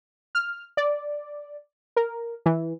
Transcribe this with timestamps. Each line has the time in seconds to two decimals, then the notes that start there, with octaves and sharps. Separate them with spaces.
0.35 F6
0.77 D5
1.96 A#4
2.46 E3